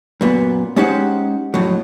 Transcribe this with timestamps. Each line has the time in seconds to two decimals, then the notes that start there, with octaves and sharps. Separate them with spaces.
0.21 F#2 A#2 B3
0.76 G#3 C#4 D#4 G4 C5 F#5
1.54 F2 A2 F#3